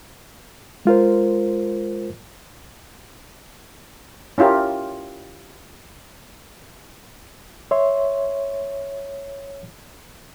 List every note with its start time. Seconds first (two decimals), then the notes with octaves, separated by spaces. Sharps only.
0.85 G#3 F4 A#4 C5
4.38 C#4 E4 F4 G4 A#4
7.71 C#5 E5 C6